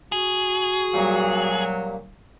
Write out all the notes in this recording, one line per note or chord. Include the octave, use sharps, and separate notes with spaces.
F#4 G#4
G2 A#2 F#3